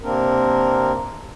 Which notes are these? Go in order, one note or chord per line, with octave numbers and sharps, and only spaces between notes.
C3 A#3 C4 D4 A#4